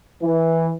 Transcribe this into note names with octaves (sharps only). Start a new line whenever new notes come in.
E3